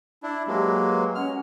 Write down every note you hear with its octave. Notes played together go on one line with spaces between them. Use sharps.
D4 E4
F#3 G#3 A#3 G4 B4
C#4 F#5 F6